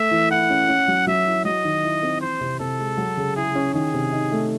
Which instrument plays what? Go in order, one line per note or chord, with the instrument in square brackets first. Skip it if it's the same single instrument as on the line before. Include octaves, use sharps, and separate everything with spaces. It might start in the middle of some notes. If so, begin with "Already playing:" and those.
Already playing: [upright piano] A3 [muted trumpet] E5
[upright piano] E3
[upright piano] E4 [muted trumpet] F#5
[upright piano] C#4
C#4
F#3
[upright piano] F#3 [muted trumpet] E5
[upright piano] E4
[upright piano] F#3 [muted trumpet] D#5
[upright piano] D#3
E4
C4
[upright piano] E3 [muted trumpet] C5
[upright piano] C3
[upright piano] C3 [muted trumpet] A4
[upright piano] G#3
F#3
C#3
[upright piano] E4 [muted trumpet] G#4
[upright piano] C#4
[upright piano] D#3 [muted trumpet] G#4
[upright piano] C3
D#4
A3